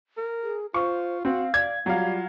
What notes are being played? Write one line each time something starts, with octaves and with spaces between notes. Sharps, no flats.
A#4
G#4
F4 C5 C#6
C4 F#4 F5
D5 G#6
F#3 G3 F4 F5